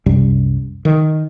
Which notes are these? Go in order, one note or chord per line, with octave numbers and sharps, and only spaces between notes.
C2 F#2 C3 G3
D#3